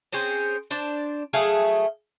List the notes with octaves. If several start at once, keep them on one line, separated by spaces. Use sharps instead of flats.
C4 C#4 G#4 C5
D4 C5 D5
F#3 A3 G#4 F5